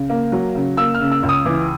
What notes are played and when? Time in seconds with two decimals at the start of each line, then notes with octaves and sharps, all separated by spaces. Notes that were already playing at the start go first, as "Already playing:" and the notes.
Already playing: C#3
0.10 A#3
0.32 F#3
0.55 C#3
0.77 A#3 E6
0.94 F6
1.00 C#3
1.11 E6
1.23 C#2
1.29 D#6
1.46 E3 D6